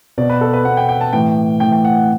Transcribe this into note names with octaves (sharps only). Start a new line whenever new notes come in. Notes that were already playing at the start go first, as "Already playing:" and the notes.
B2 D5
B4
A4
B4
B2 F#5
G5
G5
A5
A2 E3 G5
A2 E3 G5
G5
F#5
F#5